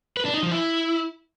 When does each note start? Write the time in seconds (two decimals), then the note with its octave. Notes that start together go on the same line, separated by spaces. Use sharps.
0.17 B4
0.25 D4
0.34 D#4
0.43 F3
0.51 E4